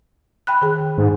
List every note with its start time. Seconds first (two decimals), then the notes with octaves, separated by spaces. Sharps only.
0.47 G5 B5 F#6
0.62 D#3 G#4
0.98 G#2